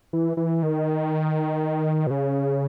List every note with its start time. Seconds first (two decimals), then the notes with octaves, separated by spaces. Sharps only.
0.13 E3
0.37 E3
0.63 D#3
2.07 B2
2.11 C#3